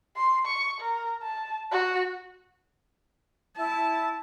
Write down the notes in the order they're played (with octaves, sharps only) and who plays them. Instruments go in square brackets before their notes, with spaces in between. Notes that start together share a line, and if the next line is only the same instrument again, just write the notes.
[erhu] C6
C#6
A#4
A5
F#4
[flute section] E4 [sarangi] A5